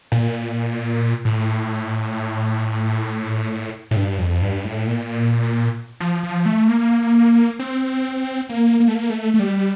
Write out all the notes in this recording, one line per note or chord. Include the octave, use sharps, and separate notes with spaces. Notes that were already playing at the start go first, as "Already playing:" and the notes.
A#2
A2
A2
G2
F2
G2
A2
A#2
F3
F3
A3
A#3
C4
A#3
A#3
A3
A#3
A3
A3
G3